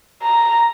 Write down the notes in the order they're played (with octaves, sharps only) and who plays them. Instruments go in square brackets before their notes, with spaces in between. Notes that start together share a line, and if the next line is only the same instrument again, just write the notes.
[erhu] A#5